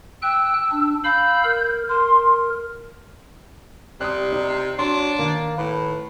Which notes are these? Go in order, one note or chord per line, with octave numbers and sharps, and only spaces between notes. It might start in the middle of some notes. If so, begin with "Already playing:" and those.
G5 E6 F#6
D4
F5 B5 E6 G6
A#4
A#4 C6
C3 G3 D#6 F#6
D#4 D5
F#3 D4 C6
D#3 A#3
A2 B4